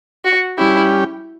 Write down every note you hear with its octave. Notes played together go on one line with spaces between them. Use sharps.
F#4
G3 C#4 E4 G4